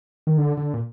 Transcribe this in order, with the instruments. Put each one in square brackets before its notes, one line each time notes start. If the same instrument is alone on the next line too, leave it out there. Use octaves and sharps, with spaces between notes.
[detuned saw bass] D#3
D3
D3
A#2